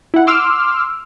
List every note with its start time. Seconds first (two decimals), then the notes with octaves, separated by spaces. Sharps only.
0.14 E4 F#5
0.27 C6 D6 E6 F6